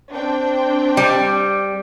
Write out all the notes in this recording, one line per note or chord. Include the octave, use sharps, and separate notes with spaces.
C4 D4 G5
G3